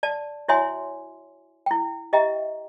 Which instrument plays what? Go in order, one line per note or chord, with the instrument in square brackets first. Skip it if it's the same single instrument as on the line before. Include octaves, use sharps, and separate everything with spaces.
[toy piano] D5 A5
E4 F#4 C#5 E5 G#5 C6
E4 G5
G4 D#5 E5 G5 A#5